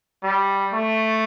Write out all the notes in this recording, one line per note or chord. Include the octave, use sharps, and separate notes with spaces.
G3
A3